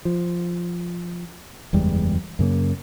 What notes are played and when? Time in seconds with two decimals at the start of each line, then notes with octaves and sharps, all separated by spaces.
0.05 F3
1.73 F#1 E2 G3 G#3
2.39 F#2 C#3 A#3